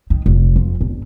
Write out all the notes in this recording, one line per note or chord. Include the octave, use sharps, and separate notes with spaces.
D#3
F1
F2
G1